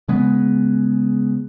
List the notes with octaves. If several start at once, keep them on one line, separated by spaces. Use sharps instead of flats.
C#3 G#3 B3